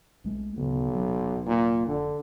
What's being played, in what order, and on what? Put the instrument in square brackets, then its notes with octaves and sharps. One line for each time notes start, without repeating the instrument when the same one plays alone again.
[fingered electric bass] B1 G#3 A3
[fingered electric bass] D1 C#3 B3 [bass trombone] B1
[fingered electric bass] D#1 C3 F#3
[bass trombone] A#2
[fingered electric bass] F1 [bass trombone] D3